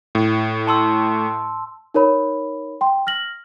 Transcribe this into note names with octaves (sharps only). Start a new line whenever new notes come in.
A2
A5 C6 E6
D#4 A#4 C#5 B5
G5 C6
F6 A#6 F#7